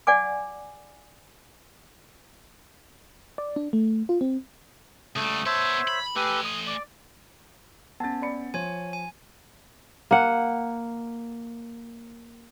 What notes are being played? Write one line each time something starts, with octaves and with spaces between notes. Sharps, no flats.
D5 F#5 G#5 D6
D5
D4
A3
F4
C4
C#2 G3 A3 D#6
B3 C5 C#5 E5 A5
B5
A3 G4 A4 B4 G#5
D#6
D5
B3 C#4 A5 A6
D5 B5 C#7
F3 C#5 G#5
G#5
A#3 F#5